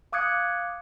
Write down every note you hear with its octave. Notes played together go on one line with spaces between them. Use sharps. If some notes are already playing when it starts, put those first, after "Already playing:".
F5 D6 D#6 F#6 G#6 C#7